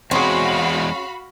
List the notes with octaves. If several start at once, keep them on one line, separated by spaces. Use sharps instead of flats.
E2 G#3 C4 C#4 F#4 G#4 F5 B5